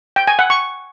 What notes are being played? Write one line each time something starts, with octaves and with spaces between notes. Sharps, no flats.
G5
G#5
F#5
C#6